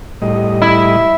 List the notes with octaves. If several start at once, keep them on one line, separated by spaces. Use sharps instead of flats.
A2 G3 D#5
E4